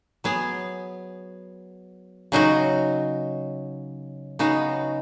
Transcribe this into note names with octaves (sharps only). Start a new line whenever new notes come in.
F#3 B3 G#4
C#3 F#3 D#4 F#4
C#3 B3 D#4 F#4